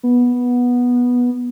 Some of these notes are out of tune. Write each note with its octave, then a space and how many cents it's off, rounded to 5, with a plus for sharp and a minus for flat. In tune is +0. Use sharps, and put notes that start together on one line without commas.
B3 -10